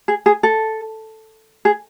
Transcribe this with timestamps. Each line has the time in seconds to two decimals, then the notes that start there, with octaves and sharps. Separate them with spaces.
0.08 G#4
0.26 G#4
0.43 A4
1.65 G#4